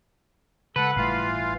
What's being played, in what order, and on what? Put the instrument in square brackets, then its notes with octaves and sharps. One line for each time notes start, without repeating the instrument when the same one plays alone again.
[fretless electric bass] C#3 G#3 [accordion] A4 F#5 [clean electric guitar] B4
[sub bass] G1 [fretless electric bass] A2 G3 A3 [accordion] E3 F4 F5